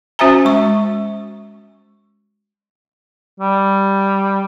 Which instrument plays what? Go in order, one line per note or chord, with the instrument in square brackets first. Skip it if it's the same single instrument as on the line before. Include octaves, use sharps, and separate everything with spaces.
[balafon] C#4 F#4 C5 E5 G#5 A#5
G#3 C#6
[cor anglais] G3